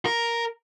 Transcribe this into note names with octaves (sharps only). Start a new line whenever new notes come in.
A#4